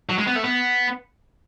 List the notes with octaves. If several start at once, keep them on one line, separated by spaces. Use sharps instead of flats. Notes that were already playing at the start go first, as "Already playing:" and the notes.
F#3
G#3
B3
A3
B3